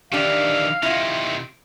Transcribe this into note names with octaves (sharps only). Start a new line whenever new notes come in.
D#3 E3 D4 G4 F5
C3 D#3 E4 F4